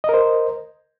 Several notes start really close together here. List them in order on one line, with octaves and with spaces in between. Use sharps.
D#5 A#4 C5